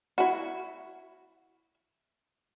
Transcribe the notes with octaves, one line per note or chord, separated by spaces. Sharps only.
E4 F#4